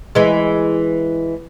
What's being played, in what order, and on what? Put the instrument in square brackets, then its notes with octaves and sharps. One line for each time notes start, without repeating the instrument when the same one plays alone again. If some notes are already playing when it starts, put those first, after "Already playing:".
[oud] E3 G#3